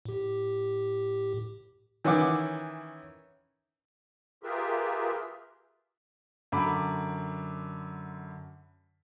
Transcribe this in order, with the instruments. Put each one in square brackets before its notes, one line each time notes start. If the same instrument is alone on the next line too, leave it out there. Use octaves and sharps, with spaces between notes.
[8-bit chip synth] A2 G4
[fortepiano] D#3 E3 C#4 E4 F#5 D6
[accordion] F4 G4 G#4 A#4 B4 E5
[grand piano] F#2 D3 B5 D6